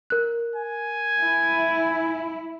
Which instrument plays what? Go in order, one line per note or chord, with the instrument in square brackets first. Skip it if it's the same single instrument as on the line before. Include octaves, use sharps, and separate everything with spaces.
[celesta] A#4 F#6
[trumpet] G#5
[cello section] E4